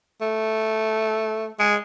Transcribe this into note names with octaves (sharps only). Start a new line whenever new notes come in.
A3
G#3